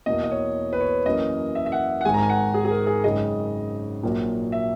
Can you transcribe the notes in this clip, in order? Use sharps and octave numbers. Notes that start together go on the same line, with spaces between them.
E2 B2 A#3 D#5
D#5
C#5
B4
C#5
F#2 E3 A#3 D#5
E5
E5
F#5
F#5
G#1 G#2 D#3 G#3 G#5
A#5
G#5
F#5
G#4
G#4
A#4
G#4
G#1 F#2 C#3 G#3 D#5
A#1 A#2 F#3 A#3
E5